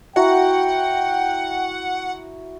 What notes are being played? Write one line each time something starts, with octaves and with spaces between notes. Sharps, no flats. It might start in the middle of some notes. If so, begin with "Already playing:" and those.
E4 F#4 F#5 G5 A#5